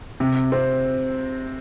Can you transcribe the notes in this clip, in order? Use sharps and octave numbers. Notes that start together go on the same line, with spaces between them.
C3
C4